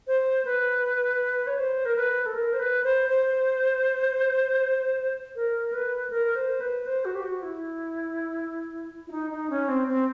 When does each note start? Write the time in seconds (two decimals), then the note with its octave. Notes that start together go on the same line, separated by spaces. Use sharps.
0.07 C5
0.45 B4
1.47 C#5
1.58 C5
1.85 A#4
1.96 B4
2.26 A4
2.34 A#4
2.53 C5
2.59 B4
2.84 C5
3.09 C5
5.36 A#4
5.72 B4
6.10 A#4
6.35 C5
6.60 B4
6.86 C5
7.05 F#4
7.15 G4
7.23 F#4
7.43 E4
9.07 E4
9.11 D#4
9.31 D#4
9.50 C#4
9.68 C4
9.88 C4